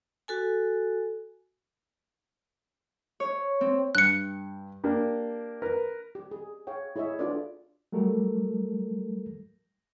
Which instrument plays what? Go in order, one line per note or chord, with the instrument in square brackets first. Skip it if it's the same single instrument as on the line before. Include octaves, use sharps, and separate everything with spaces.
[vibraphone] F#4 A4 G#5
[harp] C#5
C4
[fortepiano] G2 [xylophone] F#6 C#7
[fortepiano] A#3 D4 G4
A#4 B4
[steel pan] G4
G#4
G#4 C#5 F5 G5
E4 G#4 C#5 D#5 E5
D4 F4 F#4 A4 B4 D5
[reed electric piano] F#3 G3 A3 A4 A#4